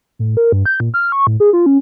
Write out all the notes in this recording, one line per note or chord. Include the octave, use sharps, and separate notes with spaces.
A2
A#4
G2
G6
A#2
F6
C#6
A2
G#4
F4
C#4